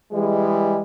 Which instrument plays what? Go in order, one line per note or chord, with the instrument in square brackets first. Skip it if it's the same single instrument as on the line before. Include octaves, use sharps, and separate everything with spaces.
[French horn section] E3 G3 G#3